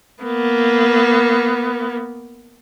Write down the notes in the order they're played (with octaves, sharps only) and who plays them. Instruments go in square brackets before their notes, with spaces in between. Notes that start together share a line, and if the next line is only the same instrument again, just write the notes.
[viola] A#3 B3